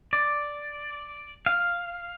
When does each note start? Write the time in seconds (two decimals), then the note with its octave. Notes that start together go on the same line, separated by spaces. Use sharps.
0.13 D5
1.46 F5